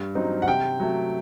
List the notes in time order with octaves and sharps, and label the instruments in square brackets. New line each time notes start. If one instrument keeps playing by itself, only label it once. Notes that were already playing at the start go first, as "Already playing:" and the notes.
Already playing: [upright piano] G2
F#3 C4 D#4
F#5
C3 G5
F#3 A3